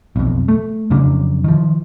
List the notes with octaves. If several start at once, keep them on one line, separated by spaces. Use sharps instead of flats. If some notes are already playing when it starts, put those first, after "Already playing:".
B1 F2
A3
F2 C#3 F#3 D4
D#3 F3